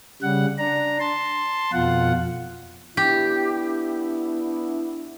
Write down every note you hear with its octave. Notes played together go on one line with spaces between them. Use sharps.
C#3 G3 F#5
D4 A#5
A5 C6
F2 B2 F4 F#5
B3 D4 E4 G4